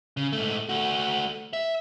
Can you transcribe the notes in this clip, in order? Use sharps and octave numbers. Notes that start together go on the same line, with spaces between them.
C#3
G#2 A3
A3 F#4
E5